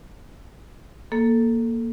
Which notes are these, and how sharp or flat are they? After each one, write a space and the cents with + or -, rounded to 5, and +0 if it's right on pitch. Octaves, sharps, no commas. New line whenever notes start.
A#3 +0 A4 +0